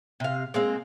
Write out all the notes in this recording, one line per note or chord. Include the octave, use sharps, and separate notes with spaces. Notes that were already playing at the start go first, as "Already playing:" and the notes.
C3 F5
G#3 A#3 C4